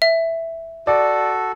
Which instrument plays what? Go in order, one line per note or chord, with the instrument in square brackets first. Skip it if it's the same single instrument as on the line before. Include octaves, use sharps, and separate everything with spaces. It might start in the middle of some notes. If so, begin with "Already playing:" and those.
[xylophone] E5
[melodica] F#4 A4 [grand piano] D5